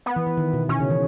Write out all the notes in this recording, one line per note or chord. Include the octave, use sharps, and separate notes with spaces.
B3
E3
E3
D#3
B2
B2 C#4
C#3
E3